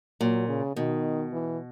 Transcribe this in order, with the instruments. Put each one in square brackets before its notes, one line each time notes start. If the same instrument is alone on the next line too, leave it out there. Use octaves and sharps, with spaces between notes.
[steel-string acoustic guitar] A#2 [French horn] F#3
[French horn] C#3
[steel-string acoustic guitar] B2 [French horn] D#3
[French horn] E3